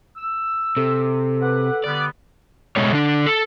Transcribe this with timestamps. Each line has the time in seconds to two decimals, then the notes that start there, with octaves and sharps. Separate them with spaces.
0.17 E6
0.77 C3 A4
1.41 B4 F#5 D6
1.84 D3 G3 B3 D5
2.76 B2 G#3 A3 C#5
2.93 D3 D4
3.26 A4